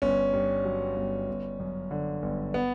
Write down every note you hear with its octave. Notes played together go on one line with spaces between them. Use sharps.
G1 C#4
G2
F#3
G1
G1
F#2
D3
G1
B3